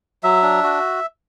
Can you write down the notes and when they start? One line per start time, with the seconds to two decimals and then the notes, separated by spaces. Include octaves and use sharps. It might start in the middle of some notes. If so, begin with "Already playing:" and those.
0.23 F#3 E5
0.43 D4
0.63 F#4